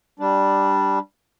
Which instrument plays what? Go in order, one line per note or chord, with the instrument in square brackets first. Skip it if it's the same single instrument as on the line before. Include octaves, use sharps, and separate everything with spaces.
[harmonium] G3 D4